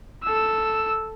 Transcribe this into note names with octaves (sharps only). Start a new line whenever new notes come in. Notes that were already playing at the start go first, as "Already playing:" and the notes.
A4 E6